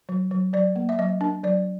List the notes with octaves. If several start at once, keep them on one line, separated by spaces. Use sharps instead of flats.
F#3
F#3
F#3 D5
A#3
E5
F#3 D#5
D4
F#3 D5